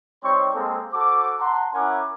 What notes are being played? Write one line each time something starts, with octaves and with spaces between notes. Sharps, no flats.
G3 C4 D#4 C#5 C6 C#6
G#3 A#3 C4 A4
F#4 A4 C5 D6
F#5 A5 A#5 C6
C#4 E4 A#4 F#5 G#5 D6